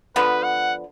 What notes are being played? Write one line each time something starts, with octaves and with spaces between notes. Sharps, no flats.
D3 F3 B3 B4
F#5